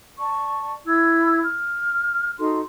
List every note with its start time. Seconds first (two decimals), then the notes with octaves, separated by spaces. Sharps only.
0.19 D5 A5 C#6
0.87 E4 E6 G#6
1.42 F6
2.39 D#4 F#4 A4 C6